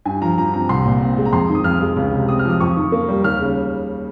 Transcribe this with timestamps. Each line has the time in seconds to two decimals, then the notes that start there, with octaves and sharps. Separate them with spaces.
0.05 G2 G#5
0.22 F3 A#5
0.38 G2 A#5
0.53 C4 A#5
0.69 C2 C6
0.85 A#2
1.01 C4
1.17 G#3
1.25 A#5
1.33 F2 C6
1.49 D#3
1.55 D#6
1.64 F2 F6
1.81 G#3
1.96 C#2
2.12 C3
2.28 C4 D#6
2.39 F6
2.45 F3
2.50 D#6
2.60 F2 C#6
2.77 D#3
2.92 A#3
3.08 G3
3.24 D#2 F6
3.40 C#3